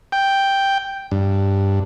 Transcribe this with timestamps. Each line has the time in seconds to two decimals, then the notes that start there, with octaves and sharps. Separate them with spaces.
0.12 G5
1.11 G2